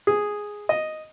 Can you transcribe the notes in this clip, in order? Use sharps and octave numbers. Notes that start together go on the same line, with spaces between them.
G#4
D#5